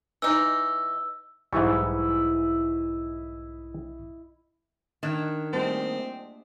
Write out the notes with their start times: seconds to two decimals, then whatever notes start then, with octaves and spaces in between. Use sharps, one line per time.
0.22 E3 D#4 E6
1.53 B1 G#2 E3 G3 E4 D#5 G#5 C#6
5.03 D#3 D4 F#6 G#6 E7
5.53 G3 A3 A#3 C4 A5